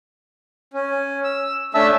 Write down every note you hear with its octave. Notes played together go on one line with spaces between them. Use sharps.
C#4
E6
A3 C#4 D4 E5 A5 E6